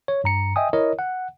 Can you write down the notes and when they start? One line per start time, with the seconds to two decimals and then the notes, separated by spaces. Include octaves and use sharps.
0.08 C#5
0.24 G2 A#5 C#7
0.56 D#5 E5 G5 G#5 D#6
0.73 E4 A#4 C#5 D#5
0.99 F#5